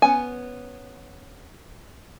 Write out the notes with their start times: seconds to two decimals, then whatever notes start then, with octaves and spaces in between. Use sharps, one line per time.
0.02 B3 C#4 G#5